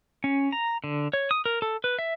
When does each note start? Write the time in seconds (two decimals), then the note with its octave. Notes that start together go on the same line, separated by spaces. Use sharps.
0.24 C#4
0.52 A#5
0.84 D3
1.13 C#5
1.31 D#6
1.46 A#4
1.62 A4
1.84 B4
1.99 E5